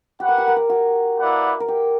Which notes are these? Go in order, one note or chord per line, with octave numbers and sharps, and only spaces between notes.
F#4 G4 B4 F#5
A#4
G4
A#4
G4
F#4
A#3 E4 B4 D5 F#5
A#4
G4